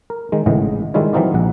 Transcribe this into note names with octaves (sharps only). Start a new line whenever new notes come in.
A#4
D#3 G#3
G#1 A2 C#3 E3 D#5
D#3 G3 G#3 E4 F4 C#5
E3 F#3 C4 D#4 F4 D5
A#1 F#5